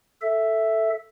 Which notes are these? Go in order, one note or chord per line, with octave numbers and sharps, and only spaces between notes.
A4 E5